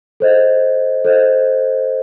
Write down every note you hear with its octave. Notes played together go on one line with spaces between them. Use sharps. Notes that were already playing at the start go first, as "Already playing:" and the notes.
A4 C5 D#5
A4 C5 D#5